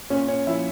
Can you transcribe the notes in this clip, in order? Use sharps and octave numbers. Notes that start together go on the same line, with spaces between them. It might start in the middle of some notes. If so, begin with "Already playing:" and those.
A#2 C#4 C#5
C#4 C#5
F3 A#3 E4 E5